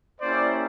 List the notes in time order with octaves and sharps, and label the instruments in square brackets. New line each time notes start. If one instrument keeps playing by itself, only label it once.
[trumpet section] A#3 C#4 E4 G4 C5 D5